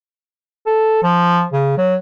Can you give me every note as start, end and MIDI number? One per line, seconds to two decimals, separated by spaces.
0.66 1.01 69
1.03 1.45 53
1.53 1.74 49
1.78 1.95 54